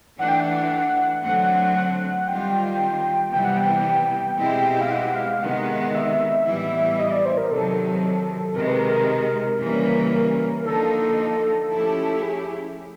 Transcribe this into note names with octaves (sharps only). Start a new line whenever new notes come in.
E3 A3 D4 F#5
G5
F#5
D3 F#3 A3 C4 F#5
F#5
D#3 G3 C4 F4 G5
C3 E3 G3 B3 G5
F#5
G5
B2 G#3 C4 E4 G4
F5
F#5
F5
C3 D#3 G#3 B3 F#5
E5
A2 E3 G3 B3 E4
D#5
D5
C5
A#4
C3 D#3 F#3 A4
C3 D#3 G#3 A#4
B4
A#4
C#3 E3 G3 A#3 C#4
D3 F3 A#3 D#4 A4
F3 A3 C#4 E4 G4
G#4